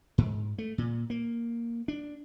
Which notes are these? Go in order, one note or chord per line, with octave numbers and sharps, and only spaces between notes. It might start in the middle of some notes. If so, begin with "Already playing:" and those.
G#2
A3
A#2
A#3
D4